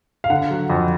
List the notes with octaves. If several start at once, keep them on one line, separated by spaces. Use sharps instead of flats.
F5
D3 F#5
F#3
F2